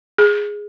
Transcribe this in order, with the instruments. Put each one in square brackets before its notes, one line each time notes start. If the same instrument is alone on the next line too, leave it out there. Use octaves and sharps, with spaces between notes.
[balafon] G#4